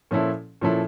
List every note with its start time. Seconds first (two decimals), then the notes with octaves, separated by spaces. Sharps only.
0.11 A#2 F3 C#4 E4 A4
0.61 A#2 F3 C#4 E4 A4